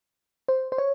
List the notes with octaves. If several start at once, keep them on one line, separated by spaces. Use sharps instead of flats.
C5
C5
C#5